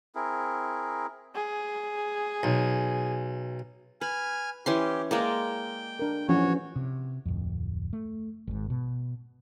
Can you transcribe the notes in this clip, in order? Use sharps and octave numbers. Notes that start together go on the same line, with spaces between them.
C4 E4 G#4 A#4
G#4
B1
B4 G#5 F6
E3 C#4 G4 C6
G#3 A#3 D5 G5
D4 A#4
E3 F3 C#4 F#4 C#5
C3
D1 F2
A3
G#1 G#2
B2